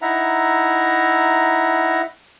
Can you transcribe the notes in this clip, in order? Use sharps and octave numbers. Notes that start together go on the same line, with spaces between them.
D#4 E4 E5 F#5 A#5